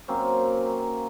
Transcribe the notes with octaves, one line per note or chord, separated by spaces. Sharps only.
F#3 A#3 C4 C#4